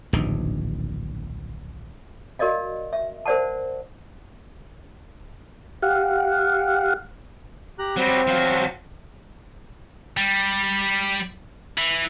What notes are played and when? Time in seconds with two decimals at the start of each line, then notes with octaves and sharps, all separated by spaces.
0.13 D1 A#1 G2 D#3
2.39 F#4 A#4 D5 D#5 F5
2.93 E5
3.26 A#4 C5 D5 F#5 A5
5.82 G4 F5 F#5
7.79 G4 A#5 F#6
7.97 F#3 G3 C4
8.27 F3 F#3
10.17 G3
11.78 E3